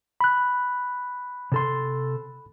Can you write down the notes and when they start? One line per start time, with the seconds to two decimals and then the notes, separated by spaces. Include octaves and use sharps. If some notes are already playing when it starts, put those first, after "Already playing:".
0.21 B5 F#6
1.52 C3 A4 C6